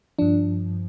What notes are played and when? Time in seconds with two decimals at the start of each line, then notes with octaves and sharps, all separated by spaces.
0.19 G2 F3 D4